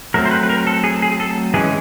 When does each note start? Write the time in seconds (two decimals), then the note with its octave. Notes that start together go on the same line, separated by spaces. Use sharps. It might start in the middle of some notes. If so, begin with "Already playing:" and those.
0.14 F#3 A3 C4 A#4
0.25 C5
0.31 B4
0.43 B4
0.49 A#4
0.67 A4
0.84 G#4
1.02 G#4
1.20 A4
1.54 E3 G#3 C#4 G#4